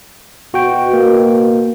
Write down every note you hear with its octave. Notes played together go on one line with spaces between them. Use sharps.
B2 F#4 G5
A#3